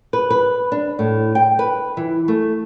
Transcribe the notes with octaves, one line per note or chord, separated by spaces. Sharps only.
B4
B4
D4
A2
G5
B4
E3
A3